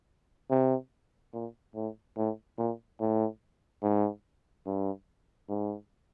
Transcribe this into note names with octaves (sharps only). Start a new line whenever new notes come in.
C3
A#2
A2
A2
A#2
A2
G#2
G2
G#2